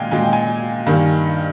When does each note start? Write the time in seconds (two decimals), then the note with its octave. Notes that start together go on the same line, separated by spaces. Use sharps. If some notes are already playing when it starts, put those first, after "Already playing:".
Already playing: A#2 G#3 F5 G5 G#5
0.11 A#2 G#3 G#5
0.22 G5
0.33 G#5
0.86 G2 D#3 A#3